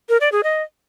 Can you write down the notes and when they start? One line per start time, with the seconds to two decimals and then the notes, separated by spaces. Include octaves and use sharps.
0.09 A#4
0.21 D5
0.32 G#4
0.43 D#5